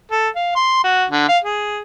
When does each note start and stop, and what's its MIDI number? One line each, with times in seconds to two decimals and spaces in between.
0.11 0.30 69
0.36 0.51 77
0.56 0.80 84
0.84 1.05 66
1.10 1.27 50
1.29 1.38 77
1.44 1.82 68